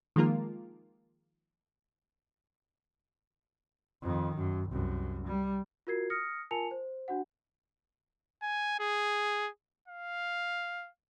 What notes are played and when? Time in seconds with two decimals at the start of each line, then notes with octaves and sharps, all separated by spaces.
0.16 D#3 F3 G#3 A#3 F4 A#4
4.02 F2 D#3
4.36 F#2
4.70 C2 F#2
5.27 G3
5.87 F4 F#4 A#4 G#6 C7
6.10 D#6 F6 A#6 C#7
6.51 F4 A#4 G#5 A5 C#7 F7
6.71 C5
7.08 D4 F#4 F#5
8.43 G#5
8.80 G#4
9.88 F5